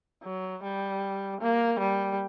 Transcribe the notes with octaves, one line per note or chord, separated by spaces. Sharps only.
F#3
G3
A#3
G3